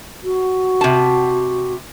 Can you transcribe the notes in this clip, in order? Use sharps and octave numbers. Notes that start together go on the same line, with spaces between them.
F#4
C3 A5